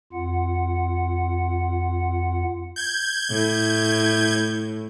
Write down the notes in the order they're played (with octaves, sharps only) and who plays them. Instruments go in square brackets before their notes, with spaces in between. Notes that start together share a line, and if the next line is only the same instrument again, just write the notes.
[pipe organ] F2 F4 F#5
[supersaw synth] G6 G#6
[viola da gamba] A2